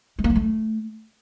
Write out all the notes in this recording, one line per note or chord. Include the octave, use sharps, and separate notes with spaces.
G#3
A#3
F#3
A3